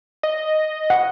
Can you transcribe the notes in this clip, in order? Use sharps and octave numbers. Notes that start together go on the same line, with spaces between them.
D#5
F#5